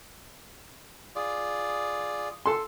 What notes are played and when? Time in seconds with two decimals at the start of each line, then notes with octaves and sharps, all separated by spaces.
1.15 F4 G#4 D5
2.46 A4 C6